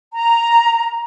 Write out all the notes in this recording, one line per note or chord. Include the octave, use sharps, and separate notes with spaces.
A#5